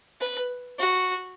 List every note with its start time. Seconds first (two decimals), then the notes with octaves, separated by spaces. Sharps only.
0.21 B4
0.79 F#4